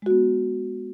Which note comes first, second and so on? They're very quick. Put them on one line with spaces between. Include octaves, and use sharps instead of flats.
G#3 F#4 B3